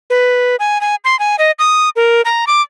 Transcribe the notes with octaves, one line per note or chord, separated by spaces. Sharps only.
B4
G#5
G#5
C6
G#5
D#5
D#6
A#4
A#5
D6